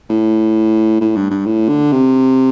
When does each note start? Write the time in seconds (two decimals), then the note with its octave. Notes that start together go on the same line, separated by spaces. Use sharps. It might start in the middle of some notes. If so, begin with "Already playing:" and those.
0.10 A2
1.01 A2
1.16 G2
1.31 G2
1.46 A2
1.69 D3
1.92 C3